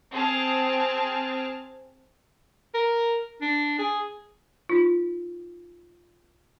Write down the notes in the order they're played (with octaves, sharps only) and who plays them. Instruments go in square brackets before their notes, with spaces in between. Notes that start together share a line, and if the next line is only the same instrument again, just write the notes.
[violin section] C4 G#4 A5 F6
[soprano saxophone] A#4
D4
G#4
[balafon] D#4 F4